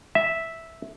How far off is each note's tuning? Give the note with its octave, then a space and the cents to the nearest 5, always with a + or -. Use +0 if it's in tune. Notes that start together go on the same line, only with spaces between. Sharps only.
E5 -5